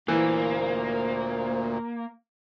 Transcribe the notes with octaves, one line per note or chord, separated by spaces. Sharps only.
D2 A#2 E3 A#3 C5